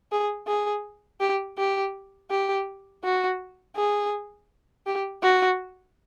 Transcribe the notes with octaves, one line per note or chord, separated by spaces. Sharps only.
G#4
G#4
G4
G4
G4
F#4
G#4
G4
F#4